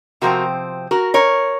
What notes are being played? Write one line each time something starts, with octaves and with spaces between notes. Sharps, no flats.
C3 F3 C4 F#4 A#4
F#4 A#4
A#4 C#5